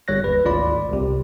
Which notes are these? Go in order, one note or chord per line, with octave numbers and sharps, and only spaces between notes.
G1 G3 C#5 F#6 A#6
D#2 B4
G#1 D2 G#2 F4 D5 B5
C2 C3